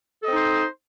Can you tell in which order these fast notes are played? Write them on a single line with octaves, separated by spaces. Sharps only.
A4 D#5 C4 D#4 C5